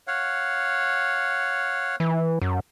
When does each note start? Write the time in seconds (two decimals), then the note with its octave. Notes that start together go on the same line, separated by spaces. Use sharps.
0.07 C#5 F5 F#5
2.00 E3
2.42 F#2